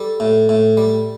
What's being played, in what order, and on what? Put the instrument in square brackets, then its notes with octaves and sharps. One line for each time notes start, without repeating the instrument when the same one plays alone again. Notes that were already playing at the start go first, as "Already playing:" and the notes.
Already playing: [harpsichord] G3 A4
A2
A2
G3